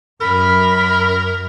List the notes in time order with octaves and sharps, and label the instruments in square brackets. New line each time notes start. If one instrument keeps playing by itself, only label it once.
[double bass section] F#2 [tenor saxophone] A#4 [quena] B5